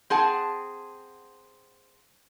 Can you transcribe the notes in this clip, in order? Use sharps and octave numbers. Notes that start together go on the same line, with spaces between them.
C4 G#4 F#5 A5